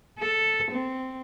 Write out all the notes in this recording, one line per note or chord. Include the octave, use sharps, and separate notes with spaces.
A4
C4